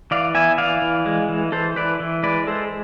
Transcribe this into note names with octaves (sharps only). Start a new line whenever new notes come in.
E3 D5 F5
B3 E5 G#5
E3 D5 F5
E3
G#3
E3
E3 A4 C5
E3 B4 D5
E3
G#3 B4 D5
G#3 A4 C5